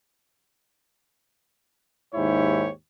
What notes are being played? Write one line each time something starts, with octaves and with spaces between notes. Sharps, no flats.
D#2 G#2 E4 G4 C#5